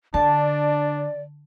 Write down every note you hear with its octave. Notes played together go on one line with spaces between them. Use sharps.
D3 D4 D5 A5